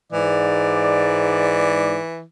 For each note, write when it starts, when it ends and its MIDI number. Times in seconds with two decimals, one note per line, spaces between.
0.13 1.97 44
0.13 2.23 52
0.13 1.97 74